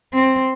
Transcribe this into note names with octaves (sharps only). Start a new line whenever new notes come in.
C4